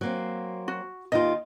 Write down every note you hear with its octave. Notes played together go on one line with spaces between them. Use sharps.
F#3 A#3 C4
F#4
D#2 D#3 F4 D#5